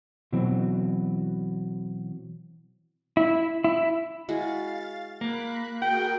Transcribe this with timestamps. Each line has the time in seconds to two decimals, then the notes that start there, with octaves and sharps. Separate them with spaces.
0.33 B2 E3 F#3 C4
3.17 E4
3.64 E4
4.29 G#3 E4 F#4 F5 A6
5.21 A#3 B5 F#6
5.82 F#4 G#4 A#4 F#5 G5